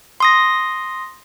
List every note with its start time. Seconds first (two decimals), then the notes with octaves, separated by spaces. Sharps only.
0.20 C6 D#6 A#6